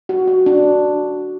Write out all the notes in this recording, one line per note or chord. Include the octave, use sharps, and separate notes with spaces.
F#4
F#4
D4